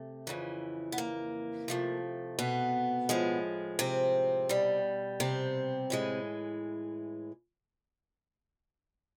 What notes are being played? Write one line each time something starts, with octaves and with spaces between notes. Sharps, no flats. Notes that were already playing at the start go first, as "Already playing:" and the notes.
Already playing: C3 A3
F2 C#3 E3
B3
A#3
C3 F3 A3
B2 B3
A2 F3 G#3
C3 C4
B2 G3
C3 C4
A2 E3 G#3